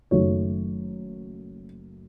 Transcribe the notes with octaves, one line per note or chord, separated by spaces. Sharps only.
F#1 F#2 D#3 F#3 A3 C#5